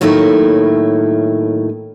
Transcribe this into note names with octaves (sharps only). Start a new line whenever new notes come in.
A2 D#3 F#3 A3 A#3 E4